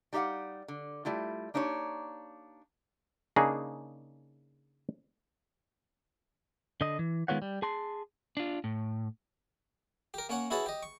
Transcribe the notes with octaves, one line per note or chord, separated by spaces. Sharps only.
G3 D#4 G4 D#5 F5 F#5
D3
G3 A3 E4 F4
A#3 D4 D#4 G4 C#5
C#3 A#3 D4 D#4 G#4
D3 D#5
E3
D#3 G#3 B3 F4 C#5 F#5
G3
G#4 A5 C6
D4 F4
A2
G4 A#4
A#3 C#4 C#5 F#5
E4 F#4 G#4 B4 C#5 A5
G4 D#5
C#6